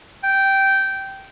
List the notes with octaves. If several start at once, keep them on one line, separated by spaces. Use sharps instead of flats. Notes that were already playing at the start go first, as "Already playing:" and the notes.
G5